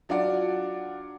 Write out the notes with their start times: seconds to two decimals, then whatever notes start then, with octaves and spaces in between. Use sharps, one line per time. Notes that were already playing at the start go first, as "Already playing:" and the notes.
0.09 F#3 D4 F4 D5 F#5